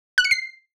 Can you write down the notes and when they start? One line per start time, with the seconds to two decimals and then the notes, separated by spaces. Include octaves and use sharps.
0.18 F#6
0.24 C#7
0.31 C7